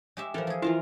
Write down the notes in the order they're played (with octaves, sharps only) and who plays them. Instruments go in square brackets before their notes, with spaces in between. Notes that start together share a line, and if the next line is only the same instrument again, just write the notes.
[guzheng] G#3 G4 E5
[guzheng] E3 F3 [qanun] A4 A#4
[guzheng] F3 G#4
[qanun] E3 F4 A#4 [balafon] E4 [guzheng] A5